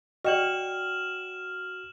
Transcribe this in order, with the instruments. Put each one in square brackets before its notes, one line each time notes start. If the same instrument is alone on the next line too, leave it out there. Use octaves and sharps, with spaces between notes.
[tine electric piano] F#4 [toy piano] D5 G5 D#6 [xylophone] D#5 [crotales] F6 E7 F#7